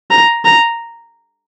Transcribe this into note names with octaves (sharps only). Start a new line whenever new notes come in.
A#5
A#5